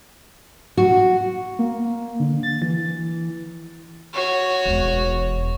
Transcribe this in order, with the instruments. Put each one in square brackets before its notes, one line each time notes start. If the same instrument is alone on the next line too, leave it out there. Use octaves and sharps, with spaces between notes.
[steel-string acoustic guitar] F#4
[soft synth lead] A#3
D3
A6
E3
[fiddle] F#4 C#5
[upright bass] E1 E2